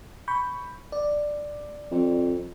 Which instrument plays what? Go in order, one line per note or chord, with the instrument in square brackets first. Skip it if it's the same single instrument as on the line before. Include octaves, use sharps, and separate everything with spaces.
[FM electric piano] B5 C#6 G6
D5
[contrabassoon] F2